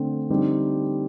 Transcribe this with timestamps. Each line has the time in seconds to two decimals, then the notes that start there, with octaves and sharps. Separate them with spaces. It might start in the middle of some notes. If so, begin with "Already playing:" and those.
Already playing: D3 A3 C4
0.30 D3 G3 C4 D#4 G4